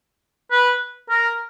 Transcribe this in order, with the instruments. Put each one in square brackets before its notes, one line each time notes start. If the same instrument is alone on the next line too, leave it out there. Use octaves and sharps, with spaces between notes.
[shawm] B4
A#4